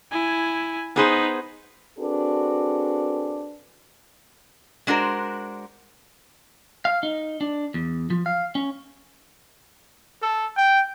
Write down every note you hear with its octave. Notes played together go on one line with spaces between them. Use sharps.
E4 G#5
B3 D#4 G#4 B4 C5
C4 D4 F#4 G#4 A4 B4
G#3 D4 F#4 A#4 C5
F5
D#4
D4
E2
F3
F5
C#4
A4
G5